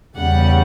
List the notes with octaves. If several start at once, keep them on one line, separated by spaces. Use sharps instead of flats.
E2 C#3 G3 F#5